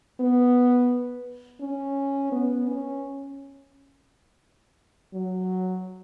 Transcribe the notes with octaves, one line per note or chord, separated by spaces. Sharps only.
B3
C#4
B3
C#4
F#3